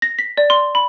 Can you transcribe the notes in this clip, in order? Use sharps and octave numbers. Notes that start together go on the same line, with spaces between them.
A#6
B6
D5
C6
B5